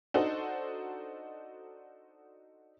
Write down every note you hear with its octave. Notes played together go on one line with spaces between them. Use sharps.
D4 D#4 F#4 A4 C5